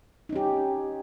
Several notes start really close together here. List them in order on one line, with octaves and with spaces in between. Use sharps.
D#4 C#4 G4